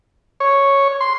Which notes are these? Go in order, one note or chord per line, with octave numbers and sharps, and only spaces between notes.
C#5
C6